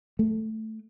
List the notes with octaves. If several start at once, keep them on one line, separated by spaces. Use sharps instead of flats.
A3